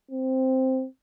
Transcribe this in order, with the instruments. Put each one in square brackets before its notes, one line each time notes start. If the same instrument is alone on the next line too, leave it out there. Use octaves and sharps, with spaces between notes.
[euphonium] C4